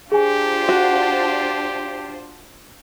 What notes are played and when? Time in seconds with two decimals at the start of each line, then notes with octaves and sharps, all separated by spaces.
0.12 D4 F4 G4 G#4 C5 G#5
0.69 F#4